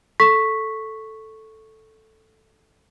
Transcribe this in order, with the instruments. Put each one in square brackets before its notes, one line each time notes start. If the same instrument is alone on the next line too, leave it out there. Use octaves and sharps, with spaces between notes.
[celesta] A4 C#6 B6